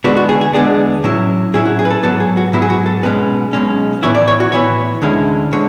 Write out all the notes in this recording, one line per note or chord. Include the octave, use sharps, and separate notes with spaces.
E2 D3 G#3 B3 D4 F#4
F#4
G#4
G#4
E2 D3 G#3 B3 D4 G#4
A2 F#3 C#4 E4
A2 F#3 C#4 E4 G#4
F#4
G#4
B4
A4
G#2 F#3 B3 A4
G#4
F#4
G#2 F#3 B3 E4
G#4
F#4
A4
B1 B2 G#3 C#4 B4
B1 B2 G#3 C#4
A2 E3 B3 E4 C#5
D5
C#5
F#4
A2 E3 B3 E4 C#5
D2 D3 G#3 C#4 E4
D3 G#3 C#5